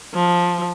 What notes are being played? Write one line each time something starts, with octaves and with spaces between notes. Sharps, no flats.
F3